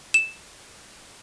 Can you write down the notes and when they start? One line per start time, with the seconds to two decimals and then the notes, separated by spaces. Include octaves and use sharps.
0.14 E7